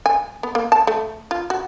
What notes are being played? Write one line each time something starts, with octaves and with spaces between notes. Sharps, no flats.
G#5
B3
A#3
A5
A3
F4
F#4